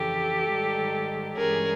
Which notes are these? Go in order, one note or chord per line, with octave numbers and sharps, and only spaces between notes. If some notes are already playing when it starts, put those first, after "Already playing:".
Already playing: F2 C#3 E3 G4 A4
G#2 D#3 G3
G2 E3 G#3 C#4 G#4 A#4